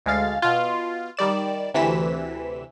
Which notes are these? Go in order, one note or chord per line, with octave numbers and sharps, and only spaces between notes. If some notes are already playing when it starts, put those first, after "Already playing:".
D2 G#3 F5 A6
B2 F4
D#3 G3 D5 E7
D2 C3 E3 B6 E7